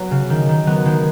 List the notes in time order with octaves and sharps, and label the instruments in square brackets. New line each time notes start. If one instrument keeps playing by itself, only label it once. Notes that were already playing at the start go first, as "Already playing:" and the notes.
Already playing: [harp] F#3 B3
C#3
D#3
D#3
F#3 B3
D#3 G#3